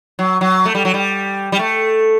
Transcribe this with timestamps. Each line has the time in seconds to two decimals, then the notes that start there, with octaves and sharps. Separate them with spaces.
0.19 F#3
0.41 F#3
0.65 A3
0.75 G3
0.85 F#3
0.94 G3
1.52 G3
1.59 A3